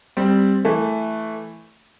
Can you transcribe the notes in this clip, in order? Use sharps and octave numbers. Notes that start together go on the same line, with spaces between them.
G3 C4
E3 A3